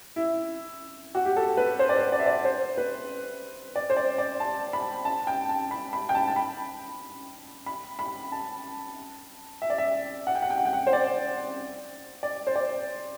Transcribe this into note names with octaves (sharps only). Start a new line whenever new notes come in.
E4
F#4
G4
A4
B4
C5
D5
C5
D5
E5
D5
C5
B4
D5
C5
D5
D5
A5
B5
A5
G5
A5
B5
B5
G5
A5
A5
B5
B5
B5
A5
E5
D5
E5
F#5
G5
F#5
G5
F#5
G5
F#5
C5
D5
D5
C5
D5